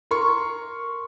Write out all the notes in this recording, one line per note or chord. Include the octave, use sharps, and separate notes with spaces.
A#4 C6 C#6